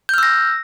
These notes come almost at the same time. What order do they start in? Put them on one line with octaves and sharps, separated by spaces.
G6 F6 E6 A#6